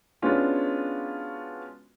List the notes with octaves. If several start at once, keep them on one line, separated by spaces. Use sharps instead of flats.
G#3 B3 C#4 D4 F4 F#4